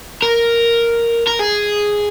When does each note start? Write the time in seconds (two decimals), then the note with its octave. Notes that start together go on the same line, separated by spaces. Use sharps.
0.22 A#4
1.27 A#4
1.40 G#4